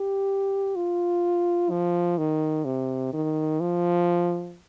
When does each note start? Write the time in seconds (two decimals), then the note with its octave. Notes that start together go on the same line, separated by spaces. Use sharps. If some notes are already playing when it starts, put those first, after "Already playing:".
Already playing: G4
0.76 F4
1.71 F3
2.18 D#3
2.65 C3
3.13 D#3
3.60 F3